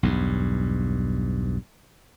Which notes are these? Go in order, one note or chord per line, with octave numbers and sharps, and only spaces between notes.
B1 E2 G2